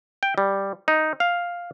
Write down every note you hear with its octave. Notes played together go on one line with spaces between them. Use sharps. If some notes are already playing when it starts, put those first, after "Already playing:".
G5
G3
D#4
F5